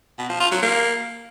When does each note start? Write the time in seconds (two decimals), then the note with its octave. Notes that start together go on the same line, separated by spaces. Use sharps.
0.19 B2
0.29 F3
0.40 F4
0.51 F#3
0.62 A#3